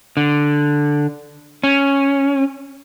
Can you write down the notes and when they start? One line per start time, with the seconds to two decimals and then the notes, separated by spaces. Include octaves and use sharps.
0.17 D3
1.64 C#4